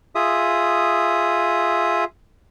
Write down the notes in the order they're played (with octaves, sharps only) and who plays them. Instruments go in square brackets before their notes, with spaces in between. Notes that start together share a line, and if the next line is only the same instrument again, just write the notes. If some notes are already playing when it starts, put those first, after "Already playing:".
[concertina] F4 G#4 E5 D#6